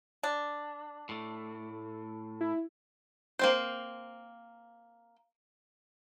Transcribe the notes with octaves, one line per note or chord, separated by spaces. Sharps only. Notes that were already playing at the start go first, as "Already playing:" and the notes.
D4
A2 A3
E4
A#3 C4 C5